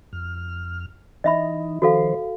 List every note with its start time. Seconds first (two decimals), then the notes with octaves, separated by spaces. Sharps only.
0.13 F2 F6
1.24 E3 D#4 D#5 E5 B5
1.82 D#3 F3 F#4 A4 C5 F5